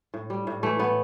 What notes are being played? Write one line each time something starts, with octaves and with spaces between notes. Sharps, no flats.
A2
G3
A2
E3 A3
A2 B3